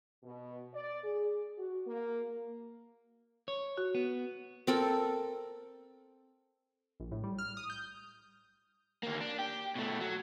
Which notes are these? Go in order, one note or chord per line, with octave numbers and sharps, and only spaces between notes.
B2
D5
G#4
F#4
A#3
C#5
F#4
B3
C4 A4 A#4
A#1
A2
G3
F6
D#6
G6
D2 A#3
D4
G4
B2 A3
F#3